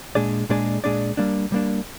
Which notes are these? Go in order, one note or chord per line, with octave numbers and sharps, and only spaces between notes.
A#2 G#3 D4 G#4 D5
A#2 G#3 D4 G#4 D5
A#2 G#3 D4 G#4 D5
G3 A#3 D4
G3 A#3 D4